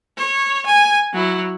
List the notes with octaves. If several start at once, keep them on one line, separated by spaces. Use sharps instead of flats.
C#5
G#5
F#3 E4